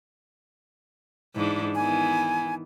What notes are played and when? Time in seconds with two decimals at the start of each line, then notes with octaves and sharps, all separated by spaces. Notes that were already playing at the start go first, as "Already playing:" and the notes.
1.35 G#2 E3 D4
1.75 D#3 E3 B3 G#5